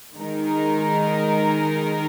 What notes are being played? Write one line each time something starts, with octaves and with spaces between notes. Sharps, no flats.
D#3 G#3 D#4 A#4